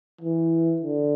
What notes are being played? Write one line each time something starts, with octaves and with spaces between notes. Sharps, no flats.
E3
D3